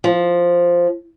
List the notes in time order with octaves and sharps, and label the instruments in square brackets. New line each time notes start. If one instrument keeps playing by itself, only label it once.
[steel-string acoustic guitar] F3